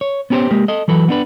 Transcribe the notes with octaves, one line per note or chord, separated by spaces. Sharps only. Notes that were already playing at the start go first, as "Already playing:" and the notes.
C#5
B3 C#4 G4 A#4 C5
G#3 A#3 G4
A4 D#5
E3 F#3 A4 B4
B3 D4 B4